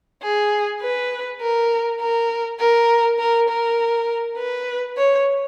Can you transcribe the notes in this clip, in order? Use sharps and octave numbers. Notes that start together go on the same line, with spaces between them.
G#4
B4
A#4
A#4
A#4
A#4
A#4
B4
C#5